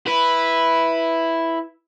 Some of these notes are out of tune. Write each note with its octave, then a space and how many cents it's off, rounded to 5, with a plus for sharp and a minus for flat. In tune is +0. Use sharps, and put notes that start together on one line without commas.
E4 +0 B4 +0